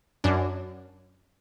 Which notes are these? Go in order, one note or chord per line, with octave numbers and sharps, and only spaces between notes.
F#2 D4